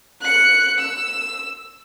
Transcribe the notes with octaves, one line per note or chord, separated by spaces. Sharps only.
F#6 C#7
E6